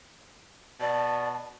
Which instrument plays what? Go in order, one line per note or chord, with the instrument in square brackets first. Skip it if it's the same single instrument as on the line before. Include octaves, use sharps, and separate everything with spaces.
[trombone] B2 [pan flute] D5 [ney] A5